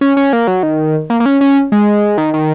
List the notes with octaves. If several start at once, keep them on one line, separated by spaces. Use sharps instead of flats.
C#4
C#4
A#3
F#3
D#3
A#3
A#3
C#4
C#4
G#3
D#3
D#3